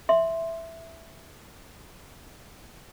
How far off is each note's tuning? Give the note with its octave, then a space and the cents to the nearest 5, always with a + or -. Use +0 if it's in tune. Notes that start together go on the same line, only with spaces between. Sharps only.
E5 +0 C6 +0